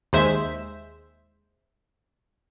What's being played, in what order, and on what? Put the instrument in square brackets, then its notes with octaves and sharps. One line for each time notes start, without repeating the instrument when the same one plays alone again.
[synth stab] D#2 G#3 C5 E5